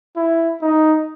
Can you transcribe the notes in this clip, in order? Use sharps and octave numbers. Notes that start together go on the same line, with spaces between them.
E4
D#4